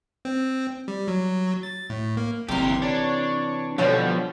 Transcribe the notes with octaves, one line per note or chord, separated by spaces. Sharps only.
C4
G3
F#3
A6
A2
A#3
G1 C3 E3 G4 A#4 C6
D4 C#5
B2 D3 F3 G3 C#5 G5